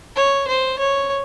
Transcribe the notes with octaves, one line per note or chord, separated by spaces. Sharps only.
C#5
C5
C#5